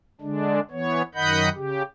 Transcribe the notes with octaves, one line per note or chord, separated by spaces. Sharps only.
D3 G#3 D4
E3 B3 C#5
F#2 D#3 D#5 F#5 B5 G6
C#3 G4